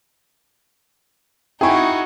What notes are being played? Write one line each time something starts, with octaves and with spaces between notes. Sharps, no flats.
D#4 E4 F#4 G#4 G5 G#5 C#6